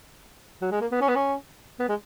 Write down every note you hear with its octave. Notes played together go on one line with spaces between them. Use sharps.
F#3
G#3
A#3
B3
C#4
B3
C#4
B3
G#3